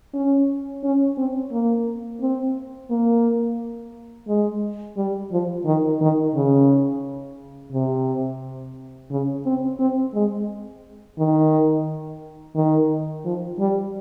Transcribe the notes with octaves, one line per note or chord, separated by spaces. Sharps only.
C#4
C#4
C4
A#3
C4
A#3
G#3
G3
F3
D#3
D#3
C#3
C3
C#3
C4
C4
G#3
D#3
D#3
F3
G3